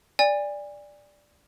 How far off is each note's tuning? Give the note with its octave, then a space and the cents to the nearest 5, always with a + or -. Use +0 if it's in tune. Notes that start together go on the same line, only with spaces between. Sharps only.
D5 +0 G#5 -35